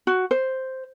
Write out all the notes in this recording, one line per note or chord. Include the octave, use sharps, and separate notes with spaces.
F#4
C5